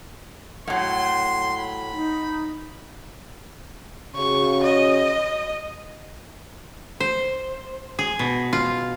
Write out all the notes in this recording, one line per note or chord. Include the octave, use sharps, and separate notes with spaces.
A2 F#3 F#5 C6
B5
D#4
C#3 F#4 C#6
D#5
C5
G#4
B2
F4